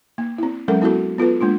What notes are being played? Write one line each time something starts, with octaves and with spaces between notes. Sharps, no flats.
A#3
C4 E4
F#3 G#3 C#4 A4 A#4
B3 E4 F#4 A4
B3 F4 A4 B4
G#3 A#3 D4 F4